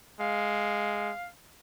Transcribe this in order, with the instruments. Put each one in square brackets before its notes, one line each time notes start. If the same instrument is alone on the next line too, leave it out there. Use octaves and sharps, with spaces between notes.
[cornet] G#3 [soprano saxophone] F5